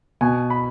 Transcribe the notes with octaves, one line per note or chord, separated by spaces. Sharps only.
B2 G#5
B5